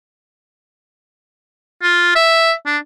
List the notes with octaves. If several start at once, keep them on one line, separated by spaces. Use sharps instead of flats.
F4
E5
D4